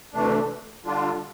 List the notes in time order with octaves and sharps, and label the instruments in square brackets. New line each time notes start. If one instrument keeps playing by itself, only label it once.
[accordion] D2 C3 E3 A3 D4
D3 G3 D4 F4